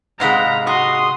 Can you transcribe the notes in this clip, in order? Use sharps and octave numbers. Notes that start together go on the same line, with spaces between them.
G#2 C3 G#3 F5 F#5 A#5 B5
F#4 C6 D#6